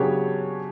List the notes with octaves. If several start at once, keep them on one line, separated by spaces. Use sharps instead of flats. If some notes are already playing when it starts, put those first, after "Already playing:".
Already playing: C#3 F#3 B3 D4 G4 C#5